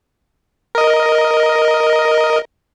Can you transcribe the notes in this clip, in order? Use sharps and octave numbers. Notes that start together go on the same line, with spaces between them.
A#4 D#5